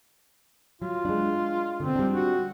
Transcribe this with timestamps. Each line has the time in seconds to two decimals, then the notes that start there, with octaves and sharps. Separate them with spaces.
0.82 F#3 F4
1.05 G#3 D4
1.80 B2 D3 C4
1.96 G3 D4
2.14 F#4